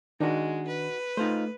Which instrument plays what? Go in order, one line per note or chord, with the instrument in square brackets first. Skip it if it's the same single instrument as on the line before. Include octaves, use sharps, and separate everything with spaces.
[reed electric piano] D#3 D4 [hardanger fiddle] G#3 [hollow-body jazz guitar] D#4 F#4
[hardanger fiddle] B4
[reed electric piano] A3 [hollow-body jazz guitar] D#4 F4 C5